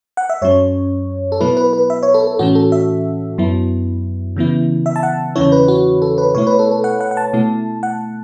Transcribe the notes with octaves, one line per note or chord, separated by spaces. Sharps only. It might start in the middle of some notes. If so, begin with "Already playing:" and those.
F#5
E5
F#2 F#3 C#4 C#5
A4
B2 F#3 B3 E4 B4
B4
B4
E5
C#5
A4
A4
A2 E3 C#4 F#4
A4
E5
F#2 F#3 B3 E4
C#3 E3 B3 E4
E5
A5
F#5
E2 C#3 E3 C#4 E4 C#5
B4
F#4
A4
B4
B2 A3 E4 C#5
B4
A4
A4
F#5
F#5
F#5
A5
B2 A3 E4
F#5